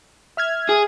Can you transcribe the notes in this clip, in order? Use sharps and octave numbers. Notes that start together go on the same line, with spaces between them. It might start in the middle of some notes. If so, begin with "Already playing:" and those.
E5 F6 G#6
G#4